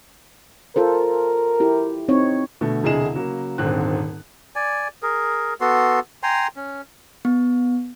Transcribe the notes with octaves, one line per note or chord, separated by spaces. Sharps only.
F4 A4 A#4 C5
E4 G4
C4 D#4 C#5
B2 D3 A3
E1 C2 D3 G#4 D#5 E7
C#3 F#3 A#3
D#1 G#1 G#2 D3 C4 F#6
D5 G#5
G#4 A#4
B3 F#4 A4 C6
G5 G#5 A#5 C6
C#4
B3